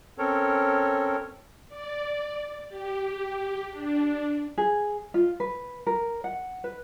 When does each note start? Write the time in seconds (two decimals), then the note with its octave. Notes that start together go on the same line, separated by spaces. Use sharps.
0.18 C4 C#4 A4 A#4 C#5
1.68 D5
2.69 G4
3.71 D4
4.58 G#4
5.14 F4
5.40 B4
5.87 A#4
6.24 F#5
6.64 B4